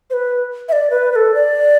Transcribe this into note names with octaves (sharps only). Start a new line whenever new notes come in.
C5
B4
E5
D5
B4
B4
A4
D5